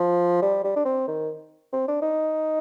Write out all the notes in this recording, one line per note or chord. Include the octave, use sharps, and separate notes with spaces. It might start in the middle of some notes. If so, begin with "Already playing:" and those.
Already playing: F3
G3
G3
D4
C4
D#3
C4
D4
D#4